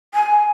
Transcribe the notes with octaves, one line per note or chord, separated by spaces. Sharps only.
G#5